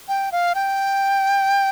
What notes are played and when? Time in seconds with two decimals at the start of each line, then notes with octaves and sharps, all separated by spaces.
0.09 G5
0.32 F5
0.55 G5